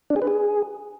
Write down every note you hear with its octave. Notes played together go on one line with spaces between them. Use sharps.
D4
G#4
B4
G#4